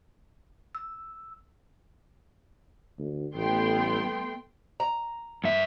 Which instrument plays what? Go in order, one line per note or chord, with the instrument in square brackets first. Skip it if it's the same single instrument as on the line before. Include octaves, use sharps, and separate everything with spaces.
[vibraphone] E6
[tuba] D2
[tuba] A1 [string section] G3 A3 B3 [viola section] G5 C6
[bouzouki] A#5
[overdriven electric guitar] G2 E5